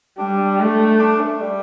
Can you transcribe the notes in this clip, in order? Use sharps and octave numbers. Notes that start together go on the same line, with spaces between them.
G3 D4
A3
D4
A3
G3